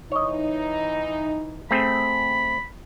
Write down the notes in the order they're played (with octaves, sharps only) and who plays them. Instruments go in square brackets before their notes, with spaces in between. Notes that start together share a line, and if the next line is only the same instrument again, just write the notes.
[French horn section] E3 D#4 [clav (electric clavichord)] C#5 D#5
[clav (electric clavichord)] A3 C4 G#4 [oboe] B5